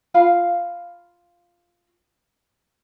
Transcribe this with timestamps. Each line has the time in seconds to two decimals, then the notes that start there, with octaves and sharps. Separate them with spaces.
0.14 F4 F5 B5